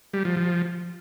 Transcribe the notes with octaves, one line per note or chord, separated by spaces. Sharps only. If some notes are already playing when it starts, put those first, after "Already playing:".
G3
F3
F3